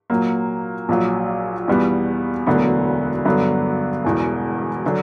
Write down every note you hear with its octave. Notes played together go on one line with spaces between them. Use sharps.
A#2 F#3 A#3
A#1 A#2 F#3
E2 B2 G3 B3
E1 D2 D3 F#3 B3
G2 D3 F#3 B3
E1 E2 B2
D3 F#3